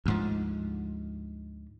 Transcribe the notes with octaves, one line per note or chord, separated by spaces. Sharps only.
D2 G#2 F3